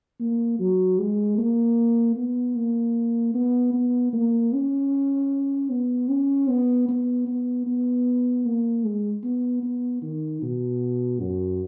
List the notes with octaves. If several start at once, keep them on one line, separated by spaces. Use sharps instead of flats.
A#3
F#3
G#3
A#3
B3
A#3
B3
B3
A#3
C#4
B3
C#4
B3
B3
B3
B3
A#3
G#3
B3
B3
D#3
B2
F#2